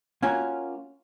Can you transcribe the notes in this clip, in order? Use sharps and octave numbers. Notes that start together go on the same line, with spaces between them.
A#3 C#4 F4 F#4 G#5